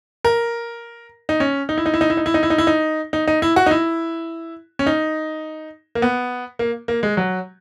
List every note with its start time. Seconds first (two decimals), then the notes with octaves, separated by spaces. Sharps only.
0.25 A#4
1.29 D#4
1.40 C#4
1.69 D#4
1.78 E4
1.86 D#4
1.94 E4
2.01 D#4
2.10 E4
2.17 D#4
2.26 E4
2.34 D#4
2.43 E4
2.50 D#4
2.58 E4
2.67 D#4
3.13 D#4
3.27 D#4
3.42 E4
3.56 F#4
3.66 D#4
3.71 E4
4.79 C#4
4.86 D#4
5.95 A#3
6.02 B3
6.59 A#3
6.88 A#3
7.03 G#3
7.17 F#3